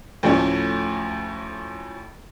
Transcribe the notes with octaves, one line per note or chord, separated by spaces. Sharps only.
D2 A2 F3 A3 C#4